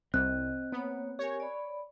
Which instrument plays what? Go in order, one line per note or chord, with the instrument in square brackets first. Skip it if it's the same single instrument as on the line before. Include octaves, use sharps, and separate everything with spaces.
[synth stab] C2 [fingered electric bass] C4 [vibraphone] D#5 [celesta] F#6
[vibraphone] A#3 C#5 [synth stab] B3
[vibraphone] G4 A#4 G#5 [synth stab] C#5
[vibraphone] D5 B5